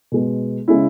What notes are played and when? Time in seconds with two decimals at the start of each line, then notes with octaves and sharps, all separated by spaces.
0.12 B2 G#3 B3
0.68 C#3 G#3 C#4 E4